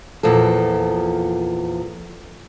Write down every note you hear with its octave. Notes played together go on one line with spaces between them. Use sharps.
E2 A#2 F3 A4